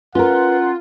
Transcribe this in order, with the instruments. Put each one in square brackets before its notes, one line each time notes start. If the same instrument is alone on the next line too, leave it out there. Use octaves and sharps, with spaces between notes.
[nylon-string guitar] C#4 A#4 [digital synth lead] F4 [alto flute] B4 [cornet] F#5